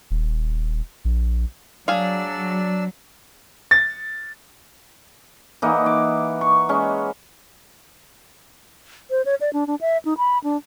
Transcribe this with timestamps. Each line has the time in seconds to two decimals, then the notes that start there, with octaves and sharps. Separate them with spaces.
0.11 D#1
1.05 A#1
1.88 F#3 D4 G#4 D5 F5 E6
3.71 A6
5.62 E3 A#3 D#4 F#5
5.86 D6
6.41 C#6
6.69 G#3 C#4
9.10 C5
9.26 C#5
9.41 D5
9.53 D4
9.67 D4
9.81 E5
10.05 D#4
10.18 B5
10.44 D4